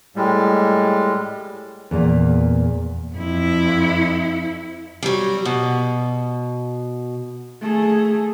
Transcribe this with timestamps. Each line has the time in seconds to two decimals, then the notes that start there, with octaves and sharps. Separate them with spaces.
0.16 A2 G3 G#3
1.91 E2 A#2
3.15 F2 E4
5.03 F#3 G3
5.45 B2
7.62 A3 G#4